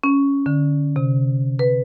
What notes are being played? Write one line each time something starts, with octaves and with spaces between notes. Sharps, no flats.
C#4
D3
C3
B4